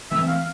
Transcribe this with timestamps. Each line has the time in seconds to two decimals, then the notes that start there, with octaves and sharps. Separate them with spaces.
0.11 E3 A3 C4 E5
0.28 F5